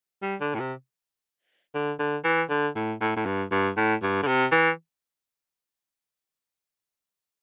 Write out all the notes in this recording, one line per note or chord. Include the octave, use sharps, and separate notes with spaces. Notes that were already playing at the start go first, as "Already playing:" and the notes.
G3
D3
A2
C3
D3
D3
E3
D3
A2
A2
A2
G2
G2
A2
G2
D3
C3
E3